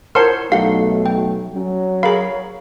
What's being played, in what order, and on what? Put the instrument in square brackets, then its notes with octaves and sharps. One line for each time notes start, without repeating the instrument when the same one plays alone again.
[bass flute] E4 [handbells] A#4 F#5 A5 [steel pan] C5 C#5 C6
[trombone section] B1 A3 [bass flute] F#3 [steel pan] D#4 G4 [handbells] F5 F#5
[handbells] G5
[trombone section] F#3 [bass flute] C#4
[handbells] G#4 F5 [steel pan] A#4 B5 [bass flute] C#5